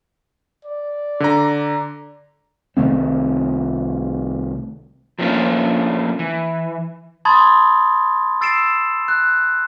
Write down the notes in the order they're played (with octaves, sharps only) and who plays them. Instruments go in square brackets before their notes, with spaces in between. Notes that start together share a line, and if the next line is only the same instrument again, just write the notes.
[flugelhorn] D5
[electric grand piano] D3 A#5
[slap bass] C2 D#3 A3 C4
[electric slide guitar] F3 F#3 A3 A#3 C#4 D4
E3
[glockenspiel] A5 B5 C6 D#6 G#6 A6
E6 A6 C7 D7 E7
F#6